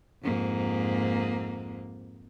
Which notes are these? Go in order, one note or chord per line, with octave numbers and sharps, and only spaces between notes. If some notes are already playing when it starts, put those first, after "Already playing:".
F2 G#2 A#3